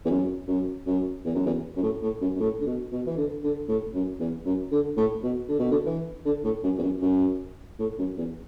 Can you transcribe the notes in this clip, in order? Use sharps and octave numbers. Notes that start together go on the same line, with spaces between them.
E2
F#2
F#2
F#2
E2
F#2
E2
F#2
A2
A2
F#2
F#2
A2
D3
B2
B2
E3
D3
D3
A2
F#2
E2
F#2
D3
A2
B2
D3
B2
D3
E3
D3
A2
F#2
E2
F#2
F#2
A2
F#2
E2